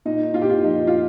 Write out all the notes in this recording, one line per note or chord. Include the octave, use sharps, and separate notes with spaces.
A#2 D#4
A#2 F4
G4
F4
F3 D#4
F4